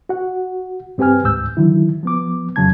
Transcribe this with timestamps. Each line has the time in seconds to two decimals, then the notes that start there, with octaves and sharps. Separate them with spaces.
0.09 F#4 F#5
0.98 G2 C4 G4 B4 G#5 F6
1.24 D2 G#2 E6 G6
1.57 D3 D#3 F#3 E4
2.03 F3 B3 D6
2.56 F2 C#3 F#3 A5 G#6